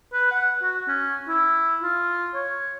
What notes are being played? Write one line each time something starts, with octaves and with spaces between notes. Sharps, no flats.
B4
F#5
F#4
C#4
E4
F4
C#5